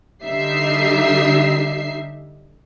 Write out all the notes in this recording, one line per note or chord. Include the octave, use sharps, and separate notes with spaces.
D3 G3 D#4 E5 C7